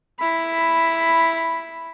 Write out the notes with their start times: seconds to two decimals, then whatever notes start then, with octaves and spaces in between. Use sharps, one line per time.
0.19 E4 B5